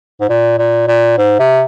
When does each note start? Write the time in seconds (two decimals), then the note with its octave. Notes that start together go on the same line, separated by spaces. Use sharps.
0.21 G#2
0.29 A#2
0.58 A#2
0.88 A#2
1.18 G#2
1.39 C3